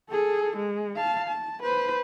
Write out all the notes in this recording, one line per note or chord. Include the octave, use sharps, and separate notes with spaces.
G#4 A4
G#3
F5 A5
A5
B4 C5